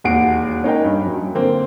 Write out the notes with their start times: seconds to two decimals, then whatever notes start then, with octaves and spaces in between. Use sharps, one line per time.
0.04 E1 D#2 F#4 C7 D7
0.64 C#4 D#4 A#4 G5
0.84 G2
1.06 F#2
1.35 D3 A#3 C4